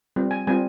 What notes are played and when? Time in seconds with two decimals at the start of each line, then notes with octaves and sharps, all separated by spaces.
0.16 G3 C4 F4
0.31 G#5
0.47 G3 C4 F4 G#5